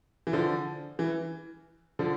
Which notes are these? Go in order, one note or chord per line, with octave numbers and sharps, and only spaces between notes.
E3
D3 F3
E3
D3 F3